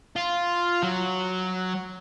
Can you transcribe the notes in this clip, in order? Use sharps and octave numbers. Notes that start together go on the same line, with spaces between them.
F4
F#3